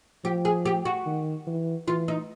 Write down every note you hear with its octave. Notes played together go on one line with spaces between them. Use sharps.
F3 G4
G#4
G4
F#4
D#3
E3
E3 F4
D#4